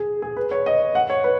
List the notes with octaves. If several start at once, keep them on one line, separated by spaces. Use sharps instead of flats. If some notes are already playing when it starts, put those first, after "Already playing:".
Already playing: G#4
G#4
B4
C#5
D#5
F#5
C#5
B4